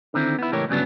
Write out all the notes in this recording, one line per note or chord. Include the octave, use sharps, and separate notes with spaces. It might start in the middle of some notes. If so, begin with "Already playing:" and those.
D3 D#3 C4 E4
B3 E4
C#2 A2 E3 G4 A#4 C#5
D2 G2 C#3 F#3 B3 D4